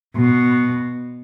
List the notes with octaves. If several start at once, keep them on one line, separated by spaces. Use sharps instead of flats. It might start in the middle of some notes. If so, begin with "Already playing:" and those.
B2